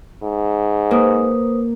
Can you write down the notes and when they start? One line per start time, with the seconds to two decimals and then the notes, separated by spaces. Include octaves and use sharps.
0.23 G#2
0.91 A#3 B4 C5 D#6